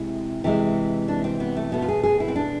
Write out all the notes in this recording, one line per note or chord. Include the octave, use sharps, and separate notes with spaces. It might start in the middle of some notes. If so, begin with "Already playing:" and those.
Already playing: C3 G#3 E4
C3 E3 G#3
D4
C4
B3
A3
B2 A3 B3
F4
G#4
G#4
E4
C4
D4